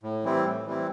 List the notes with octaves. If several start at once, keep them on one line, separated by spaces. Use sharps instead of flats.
A2
E3 G3 C4 E4
A2
E3 G3 C4 E4